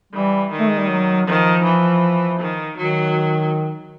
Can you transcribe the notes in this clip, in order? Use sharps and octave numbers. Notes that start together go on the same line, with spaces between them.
E3 G3
D#3
A3
G#3
G3
F#3
D#3 F3
E3
D#3
D#3 F#3